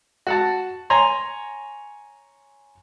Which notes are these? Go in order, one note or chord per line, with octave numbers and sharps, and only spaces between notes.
F#4 F#5 A5
C#5 G#5 A#5 C6